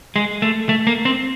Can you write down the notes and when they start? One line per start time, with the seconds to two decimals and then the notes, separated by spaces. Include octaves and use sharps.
0.16 G#3
0.42 A3
0.69 A3
0.87 A#3
1.05 C4